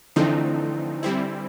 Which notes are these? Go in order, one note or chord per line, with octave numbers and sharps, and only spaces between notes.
D3 E3 F3 A3 C4 D#4
G3 C4 E4